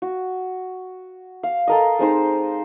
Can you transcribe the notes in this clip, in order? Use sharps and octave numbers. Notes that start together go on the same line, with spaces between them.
F#4
F5
A4 A#4 D#5
G#3 C4 D#4 C5